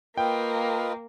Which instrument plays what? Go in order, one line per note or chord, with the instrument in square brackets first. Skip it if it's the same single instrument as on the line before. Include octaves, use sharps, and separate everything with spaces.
[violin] A#3 [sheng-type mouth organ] F4 B4 D#5 [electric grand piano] G5